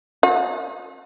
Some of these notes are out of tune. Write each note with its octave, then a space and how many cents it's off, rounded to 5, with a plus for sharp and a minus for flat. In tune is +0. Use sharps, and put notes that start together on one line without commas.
F#4 -40